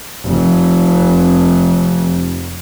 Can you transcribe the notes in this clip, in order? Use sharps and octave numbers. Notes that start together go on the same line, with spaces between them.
F1 F2